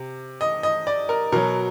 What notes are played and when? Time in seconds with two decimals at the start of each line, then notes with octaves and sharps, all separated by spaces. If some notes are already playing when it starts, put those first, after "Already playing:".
Already playing: C3
0.41 D#5
0.63 D#5
0.87 D5
1.09 A#4
1.32 B2 F#3 A#4